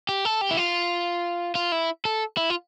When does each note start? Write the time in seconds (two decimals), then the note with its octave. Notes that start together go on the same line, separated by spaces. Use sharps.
0.09 G4
0.25 A4
0.41 G4
0.51 E4
0.57 F4
1.55 F4
1.72 E4
2.05 A4
2.37 E4
2.50 F4